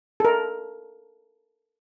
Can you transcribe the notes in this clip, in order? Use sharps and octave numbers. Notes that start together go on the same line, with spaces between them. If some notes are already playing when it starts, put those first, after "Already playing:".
A4 A#4